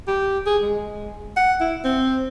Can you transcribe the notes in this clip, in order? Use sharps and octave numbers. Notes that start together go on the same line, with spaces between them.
G4
G#4
G#3
F#5
E4
C4